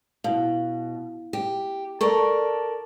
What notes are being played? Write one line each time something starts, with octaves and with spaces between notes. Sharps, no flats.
B2 E4 F5
G4
A4 A#4 D5 C#6